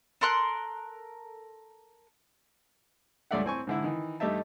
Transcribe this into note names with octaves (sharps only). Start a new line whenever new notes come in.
A4 A#4 C6 F#6
C#2 G2 A3 D5 E5 F#5
A2 C4 G#5 C#6
G#2 D3 E4
D#3 E3
G2 A3 D#4 G4 E5 A5